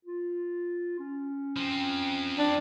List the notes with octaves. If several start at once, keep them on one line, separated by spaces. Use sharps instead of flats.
F4
C#4
F3 C4
D4